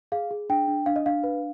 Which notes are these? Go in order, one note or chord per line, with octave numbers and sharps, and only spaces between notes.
G#4 F5
G#4
D4 G5
D4
D4 F5
D#5
D4 F5
B4